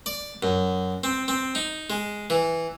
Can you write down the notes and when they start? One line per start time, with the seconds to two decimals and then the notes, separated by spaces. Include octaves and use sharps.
0.06 D5
0.43 F#2
1.04 C4
1.28 C4
1.55 D#4
1.90 G#3
2.30 E3